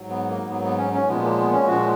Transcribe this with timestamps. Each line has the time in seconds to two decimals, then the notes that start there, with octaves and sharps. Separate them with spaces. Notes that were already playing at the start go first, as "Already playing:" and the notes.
Already playing: G#2 F#3
0.10 B3
0.29 A#3
0.49 G#2 F#3 B3
0.64 B3
0.78 C#4
0.93 C#4
1.07 A#2 F3 G#3 B3
1.23 A#3
1.38 B3
1.53 C#4
1.67 A#2 F3 G#3 F#4